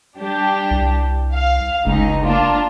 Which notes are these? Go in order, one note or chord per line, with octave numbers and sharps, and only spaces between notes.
G3 D4 G4
C2
F5
F#1 C#2 D#4
A#3 D4 F4